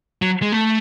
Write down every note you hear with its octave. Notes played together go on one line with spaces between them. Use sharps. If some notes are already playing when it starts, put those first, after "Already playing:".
F#3
G#3
A3